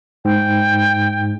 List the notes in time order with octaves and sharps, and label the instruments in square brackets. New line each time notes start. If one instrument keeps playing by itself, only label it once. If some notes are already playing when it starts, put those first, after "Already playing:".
[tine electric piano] G#2 [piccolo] G5